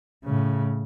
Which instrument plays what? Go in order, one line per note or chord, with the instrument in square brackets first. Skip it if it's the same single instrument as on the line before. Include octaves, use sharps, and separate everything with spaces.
[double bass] A2 C#3